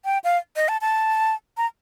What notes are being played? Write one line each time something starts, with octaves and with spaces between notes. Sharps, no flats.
G5
F5
D#5
A5
A5
A#5